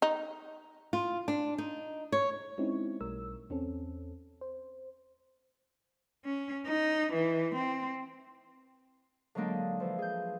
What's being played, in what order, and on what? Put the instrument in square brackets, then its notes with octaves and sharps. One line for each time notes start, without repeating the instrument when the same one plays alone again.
[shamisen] D#4
[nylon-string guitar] F4
D4
D#4
C#5
[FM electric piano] G#3 C4 C#4 D#4 E4
B1 G3 A3 A#4 E6
E2 C4 C#4 A4
C5
[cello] C#4
D#4
E3
C4
[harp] D3 F#3 G#3 A#3 D4 D#4
E3 F3
G#4 G6